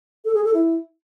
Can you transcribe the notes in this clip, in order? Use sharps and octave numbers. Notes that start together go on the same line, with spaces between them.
A4
G#4
A4
E4